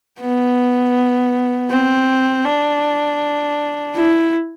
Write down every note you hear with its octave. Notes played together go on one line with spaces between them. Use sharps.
B3
C4
D4
E4